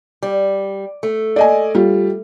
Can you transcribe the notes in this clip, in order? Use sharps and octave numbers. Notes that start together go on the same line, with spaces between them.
G3
A3
D5 D#5 G#5
G3 F4